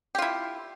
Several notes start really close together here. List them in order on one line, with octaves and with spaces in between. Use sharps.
G4 F4 E4